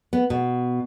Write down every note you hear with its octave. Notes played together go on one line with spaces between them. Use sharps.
B3
B2